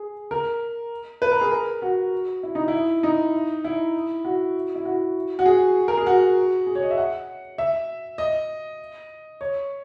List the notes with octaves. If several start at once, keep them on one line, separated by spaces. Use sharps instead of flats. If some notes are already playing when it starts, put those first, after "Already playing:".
Already playing: G#4
A#4
B4
A#4
G#4
A#4
F#4
E4
D#4
E4
D#4
E4
F#4
E4
F#4
F#4
G#4
A#4
G#4
F#4
G#4
C#5
D#5
E5
F#5
E5
D#5
C#5